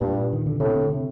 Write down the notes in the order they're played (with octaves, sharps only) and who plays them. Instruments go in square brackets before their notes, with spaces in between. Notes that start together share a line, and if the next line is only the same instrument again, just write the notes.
[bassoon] G2 [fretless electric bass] A#2
[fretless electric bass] D#3
D3
[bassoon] A2 [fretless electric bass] C3
[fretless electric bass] D3
C3